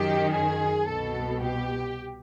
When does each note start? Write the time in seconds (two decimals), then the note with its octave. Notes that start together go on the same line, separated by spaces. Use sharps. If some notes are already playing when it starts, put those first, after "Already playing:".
Already playing: F#2 D#3 G4
0.33 G#4
0.87 C2 B2 A4
1.41 G4